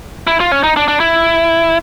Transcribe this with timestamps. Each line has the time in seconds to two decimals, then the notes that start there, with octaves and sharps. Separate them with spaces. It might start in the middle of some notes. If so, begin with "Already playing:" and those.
0.27 E4
0.40 F4
0.52 C#4
0.64 D#4
0.76 D4
0.88 D4
1.00 E4